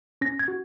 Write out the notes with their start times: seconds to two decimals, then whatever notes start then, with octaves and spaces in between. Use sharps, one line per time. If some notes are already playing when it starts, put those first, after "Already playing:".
0.21 C#4 A#6
0.39 G#6
0.48 F#4